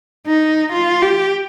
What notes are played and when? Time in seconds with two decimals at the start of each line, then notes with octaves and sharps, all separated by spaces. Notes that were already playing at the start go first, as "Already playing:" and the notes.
0.27 D#4
0.73 F4
1.02 G4